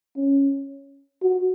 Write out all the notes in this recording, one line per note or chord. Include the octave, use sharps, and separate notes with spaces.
C#4
F#4